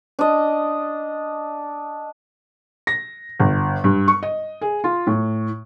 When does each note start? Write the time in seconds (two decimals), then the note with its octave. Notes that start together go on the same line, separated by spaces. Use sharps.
0.19 D4 D#5
2.87 A#6
3.40 G1
3.84 G2
4.08 C#6
4.23 D#5
4.61 G#4
4.84 F4
5.07 A2